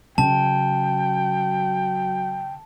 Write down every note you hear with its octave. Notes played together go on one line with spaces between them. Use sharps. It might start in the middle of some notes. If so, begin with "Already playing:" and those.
C#3 F#3 G5 A5